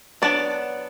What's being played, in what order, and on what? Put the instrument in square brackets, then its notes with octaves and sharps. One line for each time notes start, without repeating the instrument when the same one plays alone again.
[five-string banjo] F#3 B3 D4 D5